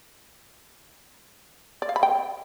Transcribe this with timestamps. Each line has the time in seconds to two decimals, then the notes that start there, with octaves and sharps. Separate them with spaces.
1.82 D5
1.89 F5
1.96 B5
2.03 G5